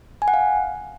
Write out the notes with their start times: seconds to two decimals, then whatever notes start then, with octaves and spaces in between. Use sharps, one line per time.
0.22 G#5
0.28 F#5
0.34 F5